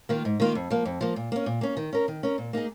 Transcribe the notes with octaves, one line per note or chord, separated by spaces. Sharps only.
D#3 A#3 F4
G#2
D#3 A#3 F4
F2
F3 A#3
F2
F3 A#3
A#2
A#3 C#4
A#2
A#3 C#4
D#3
C#4 A#4
D#3
C#4 A#4
A#2
A#3 D#4 G#4